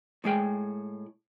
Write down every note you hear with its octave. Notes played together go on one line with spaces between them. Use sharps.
A2 G#3 G#4 G5